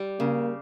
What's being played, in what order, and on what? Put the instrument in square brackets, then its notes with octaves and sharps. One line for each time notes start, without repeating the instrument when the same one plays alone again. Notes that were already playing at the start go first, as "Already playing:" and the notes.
Already playing: [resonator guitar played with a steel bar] G3
[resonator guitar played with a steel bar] C#3 [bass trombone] A#3